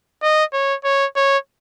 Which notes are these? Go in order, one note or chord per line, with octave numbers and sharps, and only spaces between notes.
D#5
C#5
C#5
C#5